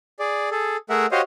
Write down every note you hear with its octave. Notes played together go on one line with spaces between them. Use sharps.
G#4 D5
G#4 A4
A3 G#4 A#4 E5 F#5
F#4 G4 C5 C#5 D#5 F5